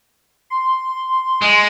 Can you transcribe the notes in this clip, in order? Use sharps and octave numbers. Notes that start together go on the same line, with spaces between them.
C6
G#3